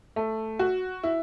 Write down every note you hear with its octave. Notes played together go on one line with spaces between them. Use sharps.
A3
F#4
E4